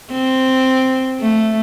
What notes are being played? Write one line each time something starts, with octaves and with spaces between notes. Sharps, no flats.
C4
A3